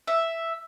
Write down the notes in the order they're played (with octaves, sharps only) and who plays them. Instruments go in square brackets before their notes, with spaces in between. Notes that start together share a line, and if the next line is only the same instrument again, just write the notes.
[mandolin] E5